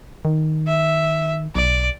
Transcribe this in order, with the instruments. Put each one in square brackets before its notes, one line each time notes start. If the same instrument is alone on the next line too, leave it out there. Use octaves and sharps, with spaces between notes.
[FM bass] D#3
[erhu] E5
[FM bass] B1 [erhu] D5